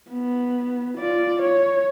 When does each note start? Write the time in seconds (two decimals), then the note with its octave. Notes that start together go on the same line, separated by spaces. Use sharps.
0.11 B3
0.98 F4 D5
1.42 C#5